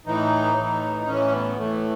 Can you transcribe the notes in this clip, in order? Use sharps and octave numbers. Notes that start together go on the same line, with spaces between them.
A2 E3 D#4
A2 E3
A2 E3 C#4
B3
A2 E3 A3